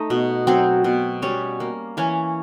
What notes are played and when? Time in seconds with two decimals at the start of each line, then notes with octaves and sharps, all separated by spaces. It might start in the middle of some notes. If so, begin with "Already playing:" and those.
Already playing: A3 D#4 D#5
0.10 B2
0.47 F#3 C4 C5
0.84 B2
1.22 G3 C#4 C#5
1.60 A#3
1.97 E3 C#4 C#5